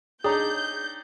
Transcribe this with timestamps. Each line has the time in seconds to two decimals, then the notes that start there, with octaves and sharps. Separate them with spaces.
0.24 D4 D#4 G#4 C#5 G5 A#5 D#6 G6